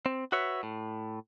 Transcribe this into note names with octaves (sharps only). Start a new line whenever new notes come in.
C4
F#4 B4 C#5 E5
A2